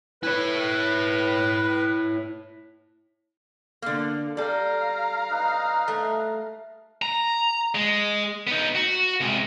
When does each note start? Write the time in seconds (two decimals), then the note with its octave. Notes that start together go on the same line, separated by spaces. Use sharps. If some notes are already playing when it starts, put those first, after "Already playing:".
0.23 E4 B4 C#5
3.82 D3 A#3
4.37 G3 A4 F5 A#5
5.31 D#4 B4
5.88 A3
7.02 A#5
7.75 G#3
8.47 B3 D#4
8.75 F#4
9.21 C3 G#3